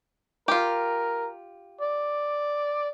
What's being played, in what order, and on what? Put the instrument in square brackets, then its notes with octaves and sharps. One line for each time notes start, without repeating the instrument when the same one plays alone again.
[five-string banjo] F4 G4 [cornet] A#4
[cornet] D5